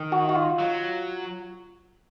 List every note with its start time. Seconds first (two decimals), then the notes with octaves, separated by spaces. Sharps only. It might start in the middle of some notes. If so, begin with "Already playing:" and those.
Already playing: D#3
0.12 F#4
0.29 F#4
0.35 F4
0.60 F#3